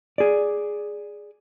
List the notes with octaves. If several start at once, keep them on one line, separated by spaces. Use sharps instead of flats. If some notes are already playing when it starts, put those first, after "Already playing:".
G#4 D5